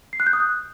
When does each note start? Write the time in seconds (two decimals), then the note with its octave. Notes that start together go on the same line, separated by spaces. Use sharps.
0.13 C7
0.20 F#6
0.26 G6
0.33 D#6
0.40 F#6